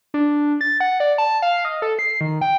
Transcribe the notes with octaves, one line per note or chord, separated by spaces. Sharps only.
D4
A6
F#5
D5
A5
F5
D#5
A4
C7
D#3
G5